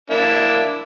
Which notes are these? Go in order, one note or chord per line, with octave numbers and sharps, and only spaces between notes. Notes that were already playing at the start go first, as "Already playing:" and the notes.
A#3 D4 E4